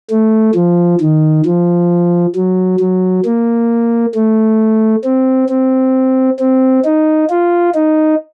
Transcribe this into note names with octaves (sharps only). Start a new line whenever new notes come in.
A3
F3
D#3
F3
F#3
F#3
A#3
A3
C4
C4
C4
D#4
F4
D#4